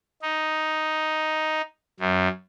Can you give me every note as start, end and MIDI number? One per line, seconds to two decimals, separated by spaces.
0.22 1.62 63
2.00 2.28 42